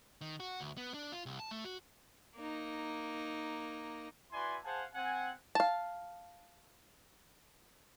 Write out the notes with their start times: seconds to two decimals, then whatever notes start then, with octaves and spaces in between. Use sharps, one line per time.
0.21 D#3
0.40 F#4
0.61 D2
0.77 B3
0.94 D4
1.12 F4
1.26 C2
1.40 A5
1.51 A3
1.65 F#4
2.36 A#3 D#4
4.32 E4 F#4 B4 D5 G#5 C6
4.63 G#4 C5 F5 F#5 G#5 A5
4.93 C4 F#5 G#5
5.55 F5 A5